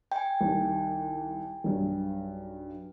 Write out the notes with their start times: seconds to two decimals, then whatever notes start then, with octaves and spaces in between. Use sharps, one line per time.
0.12 G5 G#5
0.41 C2 D#3
1.64 B1 G2